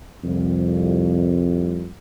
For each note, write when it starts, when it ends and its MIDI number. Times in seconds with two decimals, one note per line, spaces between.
0.24 1.87 36
0.24 1.87 41